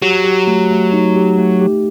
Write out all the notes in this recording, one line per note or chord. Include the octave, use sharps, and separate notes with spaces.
F#3 G4
G4
A3
A3
D#4
G4
A3
G4